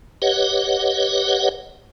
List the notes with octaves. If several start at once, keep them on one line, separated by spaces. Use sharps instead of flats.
G4 B4 C#5 D#5 F#5